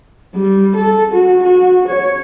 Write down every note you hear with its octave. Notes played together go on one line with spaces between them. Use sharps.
G3
A4
F#4
F#4
C#5